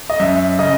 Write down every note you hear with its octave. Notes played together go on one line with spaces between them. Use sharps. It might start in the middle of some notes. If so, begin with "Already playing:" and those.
D#5
F#2 E5
C#3 D#5